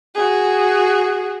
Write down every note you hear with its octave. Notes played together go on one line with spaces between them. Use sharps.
F#4 G#4